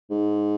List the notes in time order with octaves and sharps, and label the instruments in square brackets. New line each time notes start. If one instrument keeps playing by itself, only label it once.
[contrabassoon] G#2